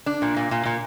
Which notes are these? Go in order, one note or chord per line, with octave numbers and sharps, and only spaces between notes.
D4
A#2
A#2
A#2
A#2